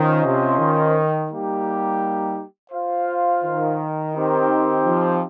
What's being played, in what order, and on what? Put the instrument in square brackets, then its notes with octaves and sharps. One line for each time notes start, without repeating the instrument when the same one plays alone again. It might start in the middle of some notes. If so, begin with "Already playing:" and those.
Already playing: [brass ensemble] D#3 [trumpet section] C#4 F4 C5 D#5
[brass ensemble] C3
D#3
[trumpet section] G3 A#3 D#4 G4
F4 C5 F5
[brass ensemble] D#3
[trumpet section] C4 D#4 G4 C5
[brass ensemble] F3